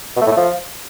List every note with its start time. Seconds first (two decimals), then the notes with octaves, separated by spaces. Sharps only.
0.16 B2
0.21 A3
0.26 A2
0.32 A3
0.37 F3